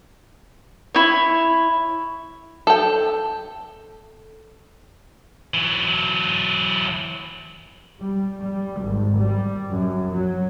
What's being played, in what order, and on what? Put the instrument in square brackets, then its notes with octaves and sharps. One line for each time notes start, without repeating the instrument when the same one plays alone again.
[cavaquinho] E4 C#5
[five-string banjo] A4 G5
[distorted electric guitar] E3 F#3
[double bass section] G3
G3
G#1
G3
F#2
F#3